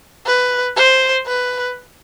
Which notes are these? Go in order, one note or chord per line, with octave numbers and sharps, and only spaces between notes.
B4
C5
B4